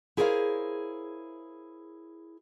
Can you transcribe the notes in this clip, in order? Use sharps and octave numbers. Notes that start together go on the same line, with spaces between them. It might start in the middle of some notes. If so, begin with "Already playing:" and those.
E4 G#4 A#4 C5 C#5 F5